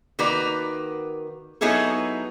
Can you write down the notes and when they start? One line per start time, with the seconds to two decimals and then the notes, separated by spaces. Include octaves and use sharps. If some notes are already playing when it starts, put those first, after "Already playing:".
0.19 D#3 A#3 F#4 B4 D5 A#5
1.61 F#3 B3 D#4 E4 G#4 A4